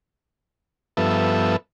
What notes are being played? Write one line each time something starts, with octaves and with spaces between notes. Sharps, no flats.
G2 F3 B3 A4 E5